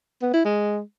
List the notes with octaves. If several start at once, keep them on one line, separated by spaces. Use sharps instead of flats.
B3
E4
G#3